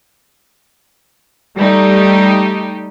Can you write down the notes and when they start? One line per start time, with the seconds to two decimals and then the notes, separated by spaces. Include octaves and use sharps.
1.55 G3 A3 D#4 G4